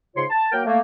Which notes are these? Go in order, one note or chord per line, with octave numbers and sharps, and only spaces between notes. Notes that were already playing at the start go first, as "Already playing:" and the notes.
G#2 C#3 F4 C#5 C6
A5
F#3 A#3 A#4 G5
A3 A#3